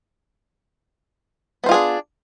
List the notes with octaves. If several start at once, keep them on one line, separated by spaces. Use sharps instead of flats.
B3 D4 F4 G#4 C5